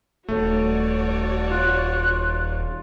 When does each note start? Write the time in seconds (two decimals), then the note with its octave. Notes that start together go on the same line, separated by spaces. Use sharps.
0.28 D#1 A3 F#4 C#5 D5
1.51 F4 F#6